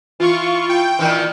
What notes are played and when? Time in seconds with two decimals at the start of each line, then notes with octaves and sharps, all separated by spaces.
0.20 E3 F4 C#6
0.69 G5
0.99 A#2 D#3 E3